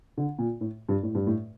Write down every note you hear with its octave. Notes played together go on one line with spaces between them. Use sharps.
D3
A#2
A2
G2
A2
G2
A2